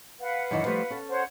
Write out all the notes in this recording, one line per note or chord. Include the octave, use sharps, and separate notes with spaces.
B4 F5 F#5
F#2 D#3 E3
F3 G3 A3
C#4 A4
C5 C#5 F#5